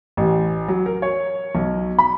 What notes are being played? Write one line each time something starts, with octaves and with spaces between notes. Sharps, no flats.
A1
F#3
A#4
C#5
B1
B5